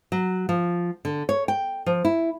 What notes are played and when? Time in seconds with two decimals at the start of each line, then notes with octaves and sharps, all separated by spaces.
0.12 F#3
0.49 F3
1.05 D3
1.29 C#5
1.48 G5
1.86 F3
2.05 E4